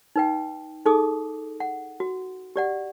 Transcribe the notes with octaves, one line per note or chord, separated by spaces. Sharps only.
D#4 B4 G5
D#4 G#4 A4 D6 D#6
F#5
F#4
G4 D5 F#5